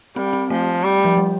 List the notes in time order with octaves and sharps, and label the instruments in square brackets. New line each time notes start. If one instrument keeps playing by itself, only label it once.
[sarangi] G3 [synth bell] C4
[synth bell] C4
[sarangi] F3 [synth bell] A3
[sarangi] G3
[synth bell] F3
G3